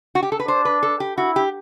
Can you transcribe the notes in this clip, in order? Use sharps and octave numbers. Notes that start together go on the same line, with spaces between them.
F#4
G4
A4
B4
D4 C5
B4
A4
G4
E4 F#4
G4